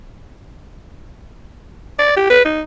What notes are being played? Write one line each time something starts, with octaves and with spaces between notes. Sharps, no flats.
D5
G4
B4
D#4